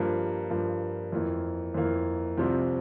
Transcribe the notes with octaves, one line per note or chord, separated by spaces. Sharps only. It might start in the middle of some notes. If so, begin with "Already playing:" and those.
Already playing: G2 F3 A#3
G2 F3 A#3
F2 E3 A#3
F2 E3 A#3
C2 C3 F3 C4